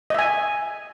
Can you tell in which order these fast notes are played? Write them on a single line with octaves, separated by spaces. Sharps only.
D#5 E5 G#5